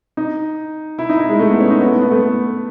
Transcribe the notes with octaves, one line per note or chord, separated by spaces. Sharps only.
D#4
E4
D#4
E4
G#3
A3
B3
C#4
D#4
B3
A3
B3
A3
B3